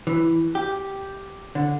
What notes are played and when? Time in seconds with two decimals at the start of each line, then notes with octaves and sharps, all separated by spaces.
0.07 E3
0.55 G4
1.55 D3